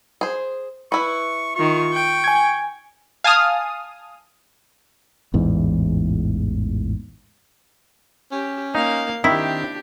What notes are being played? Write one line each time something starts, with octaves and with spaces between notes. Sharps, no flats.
G#4 C5
E4 B4 C#6
D#3 F4 C#6
G5
G#5 G#6
F5 G#5 A5 D#6 F6
A1 E2 G#2
C#4 G4
A#3 D#4 F5
D#3 C4 D4 E4 G4 E5